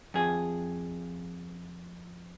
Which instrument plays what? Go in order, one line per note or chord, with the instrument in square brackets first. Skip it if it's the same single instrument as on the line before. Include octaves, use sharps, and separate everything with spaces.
[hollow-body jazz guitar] F2 G#4